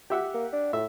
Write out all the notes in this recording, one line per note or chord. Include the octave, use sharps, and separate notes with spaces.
G4 E5 F#5
A#3
D4
A2 E5